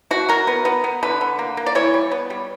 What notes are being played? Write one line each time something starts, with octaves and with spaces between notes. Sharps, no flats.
B2 F#4
F#3 A#4
B3
B3
B3
D3 B4
D3
A#3
A#3
D5
E3 C#5
G3
B3
G3